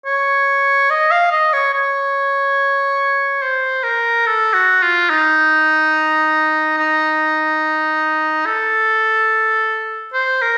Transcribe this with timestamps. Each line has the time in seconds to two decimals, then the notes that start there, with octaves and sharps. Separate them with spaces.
0.06 C#5
0.90 D#5
1.11 F5
1.32 D#5
1.53 C#5
1.74 C#5
3.42 C5
3.84 A#4
4.26 A4
4.53 F#4
4.82 F4
5.10 D#4
6.78 D#4
8.46 A4
10.14 C5
10.42 A#4